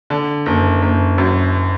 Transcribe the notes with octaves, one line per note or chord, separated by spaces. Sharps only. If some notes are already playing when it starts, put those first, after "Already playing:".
D3
F#1
F#1
F#2